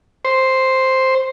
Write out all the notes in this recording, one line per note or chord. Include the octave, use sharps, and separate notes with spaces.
C5